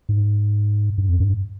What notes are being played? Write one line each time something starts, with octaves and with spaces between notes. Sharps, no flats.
G#2
G2
F2
G2